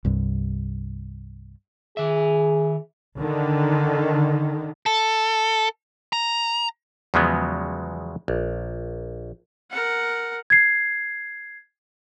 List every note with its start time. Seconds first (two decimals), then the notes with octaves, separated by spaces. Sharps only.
0.05 C2 G2
1.97 D#3 G#4 E5
3.17 D3 D#3
4.86 A4
6.13 A#5
7.14 E2 C#3 F3 F#3 G#3 B3
8.28 A#1
9.71 A#4 F#5
10.50 G#6 C7